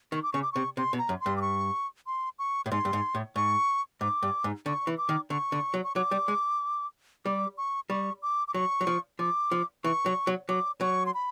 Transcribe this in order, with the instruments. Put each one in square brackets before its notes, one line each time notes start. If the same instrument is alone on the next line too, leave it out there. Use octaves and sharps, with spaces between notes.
[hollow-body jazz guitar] D#3 [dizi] C#6
[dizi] D6
[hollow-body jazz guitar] C#3 [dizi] C#6
[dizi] D6
[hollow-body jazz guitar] C3 [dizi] C#6
[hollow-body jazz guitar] C3 [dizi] C6
[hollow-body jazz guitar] B2
[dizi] A#5
[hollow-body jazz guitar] F#2
[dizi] C6
[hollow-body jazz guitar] G2
[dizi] D6
C#6
C6
C#6
[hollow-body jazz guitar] A2
[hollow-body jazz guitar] G#2 [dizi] C6
[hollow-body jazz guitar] G2
G#2
A2
[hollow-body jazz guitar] G#2 [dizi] C#6
[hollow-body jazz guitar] G#2 [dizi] D6
[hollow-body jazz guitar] G2
G#2
[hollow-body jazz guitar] D3 [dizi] C#6
[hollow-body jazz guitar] E3
[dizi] D6
[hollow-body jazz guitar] D#3
[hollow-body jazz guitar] D3 [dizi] C#6
[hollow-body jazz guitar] D3
F#3
[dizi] C#6
[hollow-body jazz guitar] F#3 [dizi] D6
[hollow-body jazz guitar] G3
G#3
[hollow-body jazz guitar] G3 [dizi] D6
[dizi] C#6
[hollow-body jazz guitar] G3 [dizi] C#6
[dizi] D6
D6
[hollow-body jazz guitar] F#3 [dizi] C#6
[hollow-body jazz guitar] F#3
F3
[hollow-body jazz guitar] F3 [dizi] D6
[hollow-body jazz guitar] F3
[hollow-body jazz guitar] E3 [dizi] C#6
[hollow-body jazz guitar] F#3
F#3
[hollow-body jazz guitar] F#3 [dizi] D6
[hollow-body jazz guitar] F#3 [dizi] C#6
[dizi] C6
B5